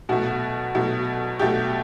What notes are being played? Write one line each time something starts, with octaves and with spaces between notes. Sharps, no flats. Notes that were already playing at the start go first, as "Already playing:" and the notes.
B2 F#3 A3 F#4
B2 F#3 A3
B2 F#3 A3 G4